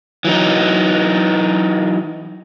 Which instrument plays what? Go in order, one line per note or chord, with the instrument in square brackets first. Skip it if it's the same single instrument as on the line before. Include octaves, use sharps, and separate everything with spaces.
[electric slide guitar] E3 F#3 D#4